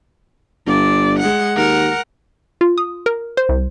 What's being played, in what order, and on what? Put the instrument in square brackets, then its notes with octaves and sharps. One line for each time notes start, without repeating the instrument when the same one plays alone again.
[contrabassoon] G1 [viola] D5
[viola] G#3 F#5
[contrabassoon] D#2 [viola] A#4 F#5
[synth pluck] F4
D#6
A#4
C5
C2